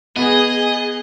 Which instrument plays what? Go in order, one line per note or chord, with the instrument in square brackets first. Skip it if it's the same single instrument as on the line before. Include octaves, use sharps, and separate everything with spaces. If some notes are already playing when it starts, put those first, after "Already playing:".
[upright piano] B3 [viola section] G#4 [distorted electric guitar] D#5